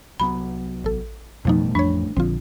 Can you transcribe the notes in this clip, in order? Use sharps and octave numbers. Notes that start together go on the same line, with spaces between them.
C2 F#3 B3 B5
A1 A4
A1 F2 B2 F3 G3 A3 D#4
F2 D4 C#5 C#6
A#1 D3 F3 C4 F4